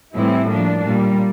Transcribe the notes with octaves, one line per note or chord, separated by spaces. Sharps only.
A2 E3 G3 C4 E4
F3 A#3 D4
A#2 G3 A#3